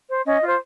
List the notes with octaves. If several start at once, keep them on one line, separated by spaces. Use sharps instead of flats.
C5
C#4 D#5
F4 C5